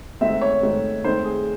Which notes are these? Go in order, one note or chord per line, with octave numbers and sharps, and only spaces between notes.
G#2 D#3 A3 C4 E5
C#5
G#2 D#3 A3 C4
G#2 D#3 A3 C4 C5
G#4